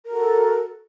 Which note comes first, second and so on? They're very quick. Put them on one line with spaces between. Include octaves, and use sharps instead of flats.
A#4 F#4 A4